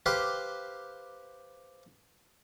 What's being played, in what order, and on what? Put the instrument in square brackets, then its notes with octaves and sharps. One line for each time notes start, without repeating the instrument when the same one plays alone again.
[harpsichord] G4 B4 C5 F5 C6 D6